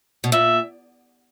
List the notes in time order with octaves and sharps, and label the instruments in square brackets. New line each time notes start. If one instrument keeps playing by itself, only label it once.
[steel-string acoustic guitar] B2
[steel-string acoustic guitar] A#2 [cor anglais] E5